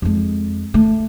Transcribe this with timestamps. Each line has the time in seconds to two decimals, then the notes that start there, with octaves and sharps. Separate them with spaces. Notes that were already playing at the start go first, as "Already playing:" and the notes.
0.02 F2 G#3
0.74 D3 A3